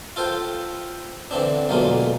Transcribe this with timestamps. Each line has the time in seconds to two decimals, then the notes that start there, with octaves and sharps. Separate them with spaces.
0.16 F4 A4 C5 G5
1.31 D3 E3 C4 D4
1.69 B1 E2 D3 G#3 A#3 F4